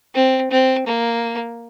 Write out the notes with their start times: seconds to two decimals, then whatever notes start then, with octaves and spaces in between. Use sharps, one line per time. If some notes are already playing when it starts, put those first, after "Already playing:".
0.15 C4
0.51 C4
0.87 A#3